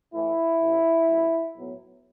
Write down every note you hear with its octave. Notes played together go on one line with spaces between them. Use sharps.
A2 E3 A3 E4
A1 A2 E3
F#2 E3 A3
B1 A2 F#3 B3